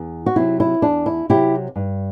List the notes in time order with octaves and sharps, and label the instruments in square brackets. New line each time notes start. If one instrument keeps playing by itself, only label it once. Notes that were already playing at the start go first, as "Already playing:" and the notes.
Already playing: [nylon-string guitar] E2
F#4
C3 F#3 C4 E4
E4
E2 D4
E4
C3 F#3 C4 E4 G4
G2